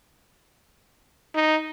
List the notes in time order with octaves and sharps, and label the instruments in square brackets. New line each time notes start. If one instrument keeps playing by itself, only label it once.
[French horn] D#4